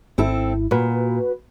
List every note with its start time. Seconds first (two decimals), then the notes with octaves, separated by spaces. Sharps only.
0.18 G#1 G#2 C4 E4 A4
0.71 A#2 F#4 B4